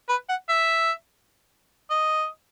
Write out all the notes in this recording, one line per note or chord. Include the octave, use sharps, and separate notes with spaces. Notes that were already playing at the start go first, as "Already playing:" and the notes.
B4
F#5
E5
D#5